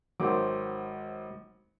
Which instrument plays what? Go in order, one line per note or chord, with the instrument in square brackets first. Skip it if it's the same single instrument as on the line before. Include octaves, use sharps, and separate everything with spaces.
[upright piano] G#1 D#3 D6 [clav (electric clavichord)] F#3 C5